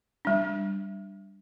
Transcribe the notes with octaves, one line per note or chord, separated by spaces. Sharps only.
G3 D4